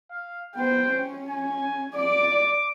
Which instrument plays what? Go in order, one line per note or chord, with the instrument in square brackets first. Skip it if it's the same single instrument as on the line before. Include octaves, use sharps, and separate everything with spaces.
[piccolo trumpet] F5
[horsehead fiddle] B3 C5 [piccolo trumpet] G5
[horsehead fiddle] C#4
[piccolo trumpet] G#5
[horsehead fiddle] D5 [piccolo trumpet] D6